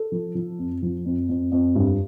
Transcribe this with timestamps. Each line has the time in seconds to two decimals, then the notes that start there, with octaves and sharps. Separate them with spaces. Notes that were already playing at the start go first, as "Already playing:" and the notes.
Already playing: A4
0.12 F3
0.35 F3
0.59 F2
0.82 F3
1.06 F2
1.29 F2
1.52 F2
1.75 G2